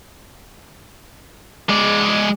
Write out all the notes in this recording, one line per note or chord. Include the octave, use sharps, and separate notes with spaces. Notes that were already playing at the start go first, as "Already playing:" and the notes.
G#3 D5